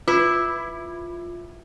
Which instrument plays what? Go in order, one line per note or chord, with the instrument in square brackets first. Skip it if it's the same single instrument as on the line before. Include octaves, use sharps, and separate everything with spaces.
[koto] E4 [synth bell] F4